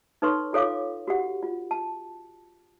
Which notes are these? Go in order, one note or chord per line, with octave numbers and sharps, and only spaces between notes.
D#4 A4 B4 C#5 C6 C#6
F4 A4 C#5 F5 D6
F#4 G4 F#5
F4
A5